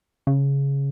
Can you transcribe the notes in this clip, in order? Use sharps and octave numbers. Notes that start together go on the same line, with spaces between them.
C#3